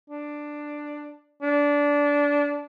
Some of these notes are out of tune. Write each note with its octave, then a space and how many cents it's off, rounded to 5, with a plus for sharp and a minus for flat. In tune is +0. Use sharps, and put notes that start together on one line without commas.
D4 +5
D4 -20